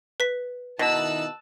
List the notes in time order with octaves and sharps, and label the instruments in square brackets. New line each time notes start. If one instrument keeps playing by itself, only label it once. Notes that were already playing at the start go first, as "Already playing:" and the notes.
[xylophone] B4 B6
[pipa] B2 [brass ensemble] D#3 D#4 E4 [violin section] A5 E6 F#6